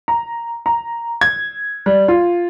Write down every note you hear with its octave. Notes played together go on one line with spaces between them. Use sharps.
A#5
A#5
G#6
G3
F4